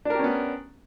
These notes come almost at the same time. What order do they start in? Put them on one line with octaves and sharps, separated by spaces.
D4 A#4 G4 C#4 B3